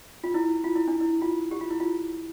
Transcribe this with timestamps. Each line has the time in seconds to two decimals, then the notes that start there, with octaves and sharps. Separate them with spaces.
0.24 F4
0.34 E4
0.64 F4
0.75 E4
0.88 D4
1.00 E4
1.22 F4
1.51 G4
1.61 F4
1.70 E4
1.80 F4